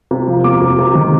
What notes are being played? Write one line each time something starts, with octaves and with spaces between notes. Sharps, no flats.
C3
F3
A#3 D6
C3
C3
D#3